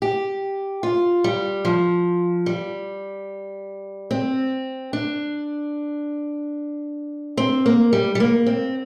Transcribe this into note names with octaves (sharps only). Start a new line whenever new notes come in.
G4
F4
G3
F3
G3
C4
D4
C4
A#3
G3
G3
A#3
C4